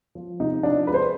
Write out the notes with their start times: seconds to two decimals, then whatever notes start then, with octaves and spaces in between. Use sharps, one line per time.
0.15 F3
0.40 C3 D#4
0.63 F3 D4
0.87 G#3 B4
0.94 C5